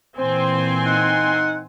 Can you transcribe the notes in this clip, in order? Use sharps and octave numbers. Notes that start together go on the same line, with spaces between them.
A#2 E3 C4 C5 G#5 C6
D#4 F#5